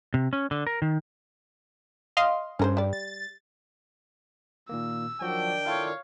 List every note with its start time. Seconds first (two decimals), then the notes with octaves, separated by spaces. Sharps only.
0.14 C3
0.33 C#4
0.51 D3
0.67 A#4
0.82 D#3
2.17 D#5 F5 C6
2.59 G2 C#4 A#4 C5
2.77 G3 D5
2.93 A6
4.69 A#2 D#3 A#3 E6
5.21 D#3 F3 F#3 D4 F#4 D5 G5
5.66 E4 F4 A4 C#5 F5